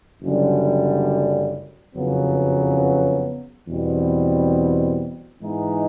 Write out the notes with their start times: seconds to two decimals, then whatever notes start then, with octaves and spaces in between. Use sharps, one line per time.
0.21 F#1 F#2 D3 G3
1.94 F#1 F2 C#3 F#3 B3
3.67 E2 B2 G3 C4
5.40 G#2 E3 G#3 B3 D#4